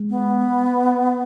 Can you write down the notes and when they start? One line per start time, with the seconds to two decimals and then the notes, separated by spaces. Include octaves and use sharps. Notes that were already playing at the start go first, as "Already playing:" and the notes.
Already playing: G#3
0.10 B3